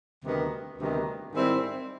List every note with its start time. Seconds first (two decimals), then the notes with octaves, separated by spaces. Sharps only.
0.24 D2 C3 D#3 G3 B3
0.79 D2 C3 D#3 G3 B3
1.33 G#2 D#3 G3 C4 E4